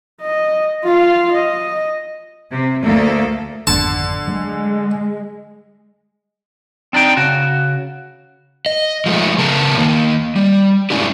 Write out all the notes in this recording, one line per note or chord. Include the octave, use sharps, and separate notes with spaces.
D#5
F4 F5
D#5
C3
D2 A3 A#3 A4
G#1 F2 D3 B3 A5
F#3 G#3 A3
C4 D4 D#4 G5
C#3 F#4
D#5
F3 G#3 A3
C#3 B3 A#4 A5
D#3 A#3
G3
G#3 A3 C#4 D4 E4 G4